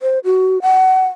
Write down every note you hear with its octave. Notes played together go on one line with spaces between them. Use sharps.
C5
F#4
F#5